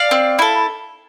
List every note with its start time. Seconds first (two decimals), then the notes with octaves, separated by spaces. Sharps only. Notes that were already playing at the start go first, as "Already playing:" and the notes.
Already playing: D5 F5
0.11 C4
0.39 E4 A4